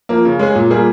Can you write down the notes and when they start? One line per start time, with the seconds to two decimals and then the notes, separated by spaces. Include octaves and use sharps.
0.09 F3 A#3
0.25 C#3
0.39 G#3 C#4 G#4
0.55 A#2
0.70 G3 A#3 F4 G#4